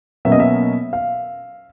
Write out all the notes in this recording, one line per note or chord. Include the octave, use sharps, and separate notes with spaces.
B2 F#3 A#3 C#4 E5
D#5
E5
F5